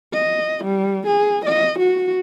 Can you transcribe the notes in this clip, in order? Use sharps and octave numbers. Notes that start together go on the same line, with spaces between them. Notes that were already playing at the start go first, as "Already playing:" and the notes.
D#5
G3
G#4
D#5
F#4